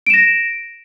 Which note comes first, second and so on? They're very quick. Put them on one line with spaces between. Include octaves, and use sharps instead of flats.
D7 E7 A#6